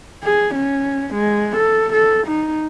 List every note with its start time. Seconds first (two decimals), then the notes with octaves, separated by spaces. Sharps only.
0.23 G#4
0.55 C#4
1.14 G#3
1.56 A4
1.93 A4
2.27 D#4